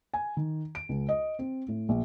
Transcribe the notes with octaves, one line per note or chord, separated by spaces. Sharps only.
G#5
D#3
D7
C#2
D#5
C4
A2
A#1